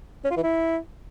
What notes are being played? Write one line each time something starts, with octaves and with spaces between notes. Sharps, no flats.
C#4
F4
E3
E4